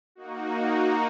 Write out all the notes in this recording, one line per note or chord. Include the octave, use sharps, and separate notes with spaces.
A#3 D#4 F#4